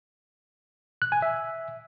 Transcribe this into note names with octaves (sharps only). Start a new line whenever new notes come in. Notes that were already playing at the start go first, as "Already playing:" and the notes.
F#6
G#5
E5